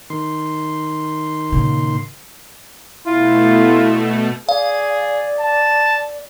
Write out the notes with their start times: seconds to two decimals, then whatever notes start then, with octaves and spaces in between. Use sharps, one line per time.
0.10 D#3 C6
1.52 A#2 C#3
3.07 B2 A3 E4 F4
4.49 G#4 D5 F5
5.40 A5